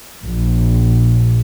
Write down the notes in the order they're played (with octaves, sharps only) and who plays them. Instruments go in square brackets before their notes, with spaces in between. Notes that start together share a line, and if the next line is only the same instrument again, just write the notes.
[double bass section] A#1